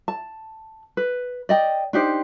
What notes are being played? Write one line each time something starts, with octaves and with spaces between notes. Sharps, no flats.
A5
B4
D5 D#5 G5
D4 D#4 G4 C5